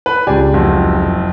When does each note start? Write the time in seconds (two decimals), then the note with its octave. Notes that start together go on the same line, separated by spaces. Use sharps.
0.06 B4
0.27 C#2 D4 G4 G#5
0.53 F#1 F2 F#4